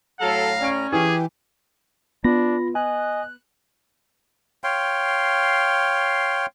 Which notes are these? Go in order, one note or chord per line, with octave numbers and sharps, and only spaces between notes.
A2 F#3 A4 F5 A#5
C#4 D5 D7
E3 G4 G#4
B3 D4 F4 B5 A#6
D#5 G#5 F#6
C#5 F5 G5 C6